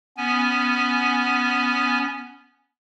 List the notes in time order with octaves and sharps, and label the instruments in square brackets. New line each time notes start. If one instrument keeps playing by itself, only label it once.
[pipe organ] B3 C#4 G#5